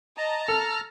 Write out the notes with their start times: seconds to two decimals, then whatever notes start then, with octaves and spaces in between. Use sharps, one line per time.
0.18 D#5 A5 A#5
0.48 A4 F6